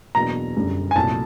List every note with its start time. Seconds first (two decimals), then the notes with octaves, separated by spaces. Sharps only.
0.15 E2 B2 F#3 A#3 D4 A#5
0.56 F#1 F#2 D3 G3
0.91 G#5
0.96 C2 A#2 F#3 A3 A5